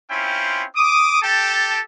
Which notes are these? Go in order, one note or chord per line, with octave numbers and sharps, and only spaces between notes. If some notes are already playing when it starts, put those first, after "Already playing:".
C4 C#4 E4 F4 G5
D6 D#6
G4 A4 G5 A5